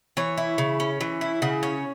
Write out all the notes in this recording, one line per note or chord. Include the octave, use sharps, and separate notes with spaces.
E3 C#5
E4
C#3
C#4
E3
E4
C#3 F#5
C#4 C#5